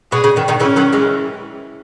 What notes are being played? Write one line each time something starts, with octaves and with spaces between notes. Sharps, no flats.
B2 G#4
C#3
B2 D#3
B2 D#3
C#3 E3 C#4
D#3 F#3
E3 G#3